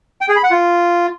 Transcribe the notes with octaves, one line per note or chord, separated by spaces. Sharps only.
G5
G#4
B5
F#5
F4